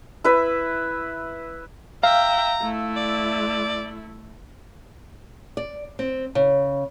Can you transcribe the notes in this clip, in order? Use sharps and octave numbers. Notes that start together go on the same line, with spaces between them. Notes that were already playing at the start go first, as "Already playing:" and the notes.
E4 B4 E5
E5 F5 G5 A#5
A3 E4
D5
D5
C4
C#3